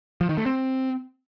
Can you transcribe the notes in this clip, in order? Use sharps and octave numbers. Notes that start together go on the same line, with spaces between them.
F3
D#3
A3
C4